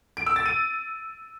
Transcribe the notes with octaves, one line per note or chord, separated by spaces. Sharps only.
D7
E6
A6
D#7